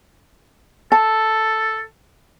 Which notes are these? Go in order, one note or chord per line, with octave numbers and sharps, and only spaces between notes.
A4 A5